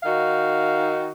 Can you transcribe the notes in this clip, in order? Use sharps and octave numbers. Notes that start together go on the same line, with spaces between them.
D#3 D#4 F#4 F5